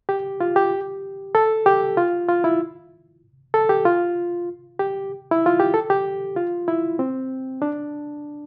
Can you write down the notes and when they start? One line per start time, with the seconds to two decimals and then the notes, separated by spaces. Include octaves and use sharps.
0.09 G4
0.41 F4
0.56 G4
1.35 A4
1.66 G4
1.97 F4
2.29 F4
2.44 E4
3.54 A4
3.69 G4
3.85 F4
4.80 G4
5.31 E4
5.46 F4
5.59 G4
5.74 A4
5.90 G4
6.36 F4
6.68 E4
6.99 C4
7.62 D4